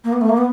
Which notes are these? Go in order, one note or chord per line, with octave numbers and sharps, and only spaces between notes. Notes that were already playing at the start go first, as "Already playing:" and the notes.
A#3
B3
A3
A#3
B3